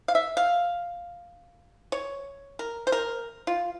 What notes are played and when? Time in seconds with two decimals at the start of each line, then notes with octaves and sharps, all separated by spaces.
0.08 F5
0.15 E5
0.37 F5
1.92 C#5
2.59 A#4
2.87 C5
2.92 A#4
3.47 F4